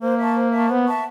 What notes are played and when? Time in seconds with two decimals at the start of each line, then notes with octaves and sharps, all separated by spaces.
0.01 A#3 C5
0.18 E5 A5 C#6
0.35 C5
0.52 E5 A5 C#6
0.69 B3 C5
0.87 E5 A5 C#6